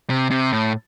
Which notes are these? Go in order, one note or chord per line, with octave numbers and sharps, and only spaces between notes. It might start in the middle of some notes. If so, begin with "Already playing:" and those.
C3
C3
A2